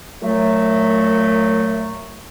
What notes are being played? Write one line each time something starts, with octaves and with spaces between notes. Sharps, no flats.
A#2 F#3 A3